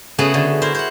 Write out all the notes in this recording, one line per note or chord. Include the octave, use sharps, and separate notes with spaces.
C#3 A3 B3 F#4 G#4 F#5
D3
E4 A#4 C5
C5 F#5